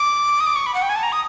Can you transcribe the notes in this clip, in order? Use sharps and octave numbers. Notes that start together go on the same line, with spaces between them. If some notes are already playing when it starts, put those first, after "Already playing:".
Already playing: D6
D#6
D6
C#6
B5
F#5
G5
G#5
A5
A#5
D#6